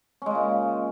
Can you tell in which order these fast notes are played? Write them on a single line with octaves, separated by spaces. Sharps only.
C#4 G#3 C#3 A#2